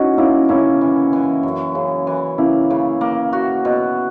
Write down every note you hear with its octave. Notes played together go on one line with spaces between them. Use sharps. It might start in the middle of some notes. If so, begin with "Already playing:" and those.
Already playing: C#4 D#4 E4 F#4
A#3 C#4 E4
A#3 C#4 E4
E3
E3
F#2
C#3
E3
A#3 C#4 E4
C#3
A#3
F#4
B2